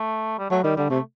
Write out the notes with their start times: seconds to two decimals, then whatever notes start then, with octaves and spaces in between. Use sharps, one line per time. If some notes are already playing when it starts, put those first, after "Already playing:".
Already playing: A3
0.38 G3
0.50 F#3 A3
0.63 D#3 G3
0.76 D3 G3
0.90 C3 A3